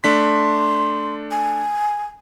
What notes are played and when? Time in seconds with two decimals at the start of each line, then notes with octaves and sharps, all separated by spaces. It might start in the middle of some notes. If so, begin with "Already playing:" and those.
0.04 A3 D4 C6 B6
1.31 G#5